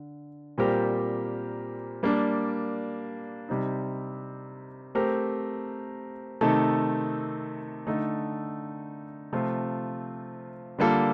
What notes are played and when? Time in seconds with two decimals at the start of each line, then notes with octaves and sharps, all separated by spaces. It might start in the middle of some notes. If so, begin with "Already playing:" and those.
Already playing: D3
0.58 A#2 G3 C4 G4 A#4
2.03 G3 A#3 D4
3.49 C3 G3 C4 D#4
4.95 A3 C4 G4 A#4
6.41 C3 D#3 A3 D#4 A4
7.87 D3 A3 D#4 A4
9.33 C3 F3 A3 C4 F4
10.79 D3 G3 A#3 F4 A4